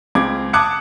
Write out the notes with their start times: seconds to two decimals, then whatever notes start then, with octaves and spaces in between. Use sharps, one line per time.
0.15 C#2 C4 D6 G#6
0.53 A5 D6 D#6 F#6 G#6 C#7